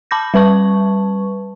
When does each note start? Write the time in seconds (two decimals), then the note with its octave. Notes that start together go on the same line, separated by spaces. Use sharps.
0.11 A5 B5 D6 G6 A#6
0.34 G3 B4 A5 C#6